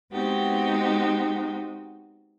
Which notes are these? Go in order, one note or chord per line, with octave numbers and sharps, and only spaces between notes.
G#3 B3 C4 D#4 F#4 G4